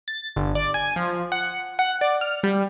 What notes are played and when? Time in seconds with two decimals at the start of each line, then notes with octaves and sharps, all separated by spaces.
0.08 A6
0.36 G1
0.55 D5
0.74 G#5
0.96 F3
1.32 F#5
1.79 F#5
2.01 D5
2.21 F6
2.43 G3